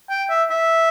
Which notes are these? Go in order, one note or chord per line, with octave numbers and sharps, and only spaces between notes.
G5
E5
E5